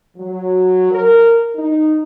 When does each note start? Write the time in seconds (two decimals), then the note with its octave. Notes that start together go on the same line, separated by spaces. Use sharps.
0.17 F#3
0.92 A#4
1.56 D#4